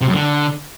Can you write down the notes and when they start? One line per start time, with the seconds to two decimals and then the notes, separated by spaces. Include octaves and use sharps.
0.01 C3
0.07 F#2
0.14 D3